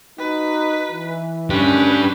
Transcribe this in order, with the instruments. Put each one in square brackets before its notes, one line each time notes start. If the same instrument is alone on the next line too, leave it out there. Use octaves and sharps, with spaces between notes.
[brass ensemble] D#4 F#4 [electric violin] B4
[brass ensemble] E3
[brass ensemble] D2 D#3 [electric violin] C#4 B4 [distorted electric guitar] D4 G4